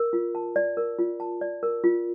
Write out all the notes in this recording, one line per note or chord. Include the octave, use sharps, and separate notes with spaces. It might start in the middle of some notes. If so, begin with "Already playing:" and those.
Already playing: A#4
F4
A5
D5
A#4
F4
A5
D5
A#4
F4